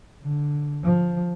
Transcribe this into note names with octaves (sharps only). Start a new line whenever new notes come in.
D3
F3